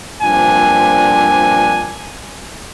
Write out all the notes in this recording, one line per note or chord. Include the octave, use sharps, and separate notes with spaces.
G2 A#2 F3 C4 D4 G#5